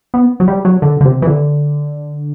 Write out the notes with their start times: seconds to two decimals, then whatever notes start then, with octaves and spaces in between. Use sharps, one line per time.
0.14 B3
0.40 F#3
0.48 G3
0.65 F#3
0.82 D3
1.01 D3
1.05 C3
1.22 E3
1.27 D3